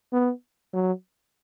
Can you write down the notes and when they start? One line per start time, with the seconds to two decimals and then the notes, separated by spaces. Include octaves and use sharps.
0.13 B3
0.74 F#3